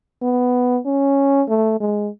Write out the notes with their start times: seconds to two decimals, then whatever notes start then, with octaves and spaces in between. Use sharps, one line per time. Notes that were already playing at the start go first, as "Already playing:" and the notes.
0.22 B3
0.86 C#4
1.49 A3
1.80 G#3